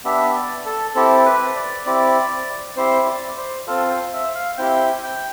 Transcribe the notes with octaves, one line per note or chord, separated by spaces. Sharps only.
B3 D4 G4 E5
D5
A4
C4 E4 G4 A4
B4
D5
C4 E4 G4 D5
C4 E4 G4 C5
D5
C5
C4 F4 A4
C5
E5
F5
C4 E4 G4 G5
G5